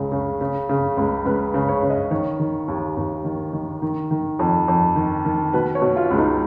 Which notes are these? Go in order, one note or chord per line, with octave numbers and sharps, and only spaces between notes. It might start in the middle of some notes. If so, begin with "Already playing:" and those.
Already playing: C#2 C#3
C#3
C#3
C#3
C#2
C#2 B4
C#3
C#5
C#3
D#5
D#3 C#5
D#3
D#2
D#2
D#3
D#3
D#3
D#3
F2
F2
D#3
D#3
B2 B4
C#5
B2
F4
C#2
D#4